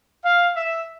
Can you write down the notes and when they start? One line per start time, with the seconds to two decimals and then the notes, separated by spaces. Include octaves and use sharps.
0.24 F5
0.56 E5